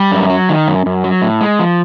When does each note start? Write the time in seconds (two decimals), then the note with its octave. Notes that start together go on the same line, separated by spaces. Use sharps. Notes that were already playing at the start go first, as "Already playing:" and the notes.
Already playing: G3
0.12 F#2
0.30 F#3
0.49 D#3
0.68 F#2
0.86 F#2
1.04 F#3
1.22 A2
1.41 G#3
1.59 F3